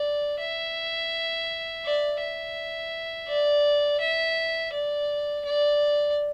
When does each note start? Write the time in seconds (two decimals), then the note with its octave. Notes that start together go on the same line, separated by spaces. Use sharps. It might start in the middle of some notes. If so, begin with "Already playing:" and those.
Already playing: D5
0.40 E5
1.85 D5
2.21 E5
3.28 D5
4.00 E5
4.73 D5
5.45 D5